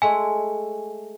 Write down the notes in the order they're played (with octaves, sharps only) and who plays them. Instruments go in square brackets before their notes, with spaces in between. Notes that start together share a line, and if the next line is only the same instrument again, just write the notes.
[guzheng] G#3 A3 E5 [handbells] G#5